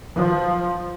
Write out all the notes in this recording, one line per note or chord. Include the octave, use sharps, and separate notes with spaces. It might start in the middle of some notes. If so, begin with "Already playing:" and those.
F3